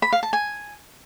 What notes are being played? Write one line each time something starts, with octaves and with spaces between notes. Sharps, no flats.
B5
F5
A5
G#5